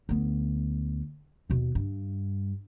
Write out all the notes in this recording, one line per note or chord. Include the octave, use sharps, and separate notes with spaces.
D2 B3
D#2 B2
G2